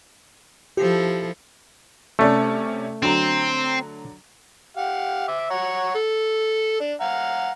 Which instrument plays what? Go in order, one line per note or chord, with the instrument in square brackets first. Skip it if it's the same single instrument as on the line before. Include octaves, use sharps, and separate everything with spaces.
[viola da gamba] F3 E4 A4 [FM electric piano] G4
[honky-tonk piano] C3 C#4 D5 [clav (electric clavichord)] A3
[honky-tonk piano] D3 F#3 A#5 [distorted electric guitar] C4
[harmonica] G4 F5 F#5
E5 D6
C#5 F#5 A#5
A4
D4
F5 F#5 A#5